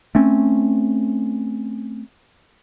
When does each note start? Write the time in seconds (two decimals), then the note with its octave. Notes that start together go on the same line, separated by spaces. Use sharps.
0.15 A3 C4 C#4